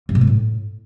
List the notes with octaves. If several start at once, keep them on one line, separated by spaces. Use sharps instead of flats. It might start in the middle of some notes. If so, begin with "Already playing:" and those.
G2
B2
G#3
A2